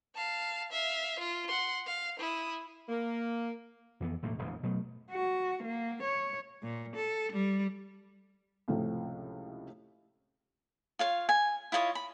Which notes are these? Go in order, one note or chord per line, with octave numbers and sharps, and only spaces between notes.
F5 A5
E5 F5
F4
F#5 C6
F5
E4 D#6
A#3
F2 E3 B3
E1 A2 A3 A#3
E1 A#1 E2 E3
B2 F#3 A3
F#4
A#3
C#5
A#2
A4
G3
C#2 A2 C3 F3 A3
F4 C#5 F5
G#5
E4 F4 C#5 D#5
B5